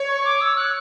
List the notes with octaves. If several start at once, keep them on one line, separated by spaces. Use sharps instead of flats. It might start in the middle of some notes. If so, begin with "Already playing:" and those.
Already playing: C#5
C#6
D6
E6
F#6